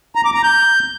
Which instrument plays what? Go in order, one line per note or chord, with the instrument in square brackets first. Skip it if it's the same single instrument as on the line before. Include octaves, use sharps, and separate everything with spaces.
[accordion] A#5
D6
A#5
G6